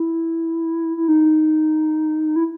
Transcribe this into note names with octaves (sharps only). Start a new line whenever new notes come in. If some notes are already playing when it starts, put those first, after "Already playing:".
Already playing: E4
E4
D#4
E4